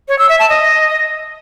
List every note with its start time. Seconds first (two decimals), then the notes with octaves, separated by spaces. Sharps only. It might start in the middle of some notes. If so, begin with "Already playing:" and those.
0.08 C#5
0.19 E6
0.29 E5
0.39 A5
0.50 D#5